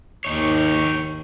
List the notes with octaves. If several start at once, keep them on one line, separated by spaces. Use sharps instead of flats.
D#2 G#2 D#4 C#5